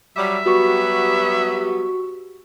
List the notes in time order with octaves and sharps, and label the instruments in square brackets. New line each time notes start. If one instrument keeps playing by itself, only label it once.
[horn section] F#3 G3 [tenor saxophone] E5
[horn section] F#3 G3 B3 [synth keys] F#4 G4 C#6